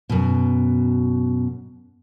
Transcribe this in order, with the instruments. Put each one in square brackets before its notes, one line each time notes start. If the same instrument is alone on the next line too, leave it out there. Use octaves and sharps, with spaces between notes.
[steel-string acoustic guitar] F#2 B2